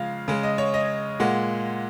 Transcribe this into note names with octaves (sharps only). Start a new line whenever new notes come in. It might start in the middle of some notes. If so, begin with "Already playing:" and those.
Already playing: C#3 F3 G#3 F5
C#3 G#3
D#5
C#5
D#5
A#2 G#3 F#5